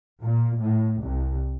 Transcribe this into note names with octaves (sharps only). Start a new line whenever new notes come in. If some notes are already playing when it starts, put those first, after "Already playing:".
A#2
A2
C2